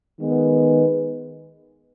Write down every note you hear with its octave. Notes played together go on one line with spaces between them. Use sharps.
D#3 G#3 B3